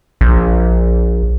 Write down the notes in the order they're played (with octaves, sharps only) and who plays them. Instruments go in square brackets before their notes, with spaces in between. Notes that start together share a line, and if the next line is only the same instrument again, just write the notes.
[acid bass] A#1